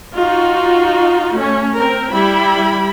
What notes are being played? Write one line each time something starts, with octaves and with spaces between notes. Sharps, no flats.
D#4 F4 F#4
A3 C#4
C4 A#4
G3 E4 B5